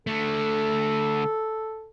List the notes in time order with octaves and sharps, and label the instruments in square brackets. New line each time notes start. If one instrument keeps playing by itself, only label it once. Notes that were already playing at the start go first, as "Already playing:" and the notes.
[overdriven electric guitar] D3 A3 [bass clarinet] A4